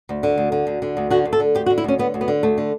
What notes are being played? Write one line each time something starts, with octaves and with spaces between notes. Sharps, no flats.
D2
D3
D2
D3
D2
D3
D2
D3 F#4
D2
A4
D3
D2 G4
F#4
D3
E4
D2 C#4
D3 B3
D2
B3
D3
D2 A3
D3